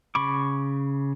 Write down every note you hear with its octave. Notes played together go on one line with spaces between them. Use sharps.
C#3 B5 C#6 D6